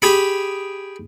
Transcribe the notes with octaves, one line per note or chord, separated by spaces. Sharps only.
G4 G#4 B5